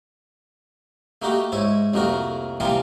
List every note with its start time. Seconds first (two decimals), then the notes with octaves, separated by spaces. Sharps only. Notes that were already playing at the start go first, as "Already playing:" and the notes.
1.22 A3 A#3 D#4 F#4 G4
1.52 G#2 E4 C#5
1.94 C2 F2 A3 A#3 F#4 A#4
2.60 C3 E3 F3 G3 A#3 F4